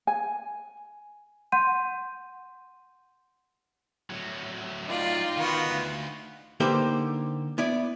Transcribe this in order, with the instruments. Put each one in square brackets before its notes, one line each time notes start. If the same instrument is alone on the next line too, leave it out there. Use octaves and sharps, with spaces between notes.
[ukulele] G#5
[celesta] F#5 C6 G6 D#7
[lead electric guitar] A2 F#3
[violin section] D#4 F4 G5 [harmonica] D5
[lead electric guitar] D#3 [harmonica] B3 F#4
[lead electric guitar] D2
[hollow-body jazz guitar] D3 A#3 D#4 G4 B4 C5
B3 E4 D5